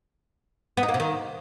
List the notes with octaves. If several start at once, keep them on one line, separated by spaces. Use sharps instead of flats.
B3
D#4
A#3
C3
D#3